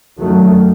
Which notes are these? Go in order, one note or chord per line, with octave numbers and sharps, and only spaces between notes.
F#2 D#3 F#3 A3